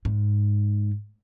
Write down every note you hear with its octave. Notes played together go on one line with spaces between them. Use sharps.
G#2